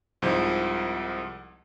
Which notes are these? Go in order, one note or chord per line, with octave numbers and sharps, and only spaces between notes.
C2 G#2 F3